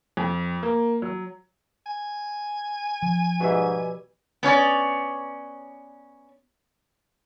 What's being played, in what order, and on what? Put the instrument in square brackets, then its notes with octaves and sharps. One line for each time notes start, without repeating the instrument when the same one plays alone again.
[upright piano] F2
A#3
F#3
[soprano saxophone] G#5
[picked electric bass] F3
[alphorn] G#2 [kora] B2 G3 E5
[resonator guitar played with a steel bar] B3 C#4 C#5 D5